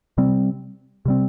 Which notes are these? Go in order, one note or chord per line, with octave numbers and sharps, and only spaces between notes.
C3 G3 C4
C3 G3 C4